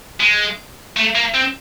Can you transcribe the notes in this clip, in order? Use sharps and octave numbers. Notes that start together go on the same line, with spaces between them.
G#3
A3
A#3
C4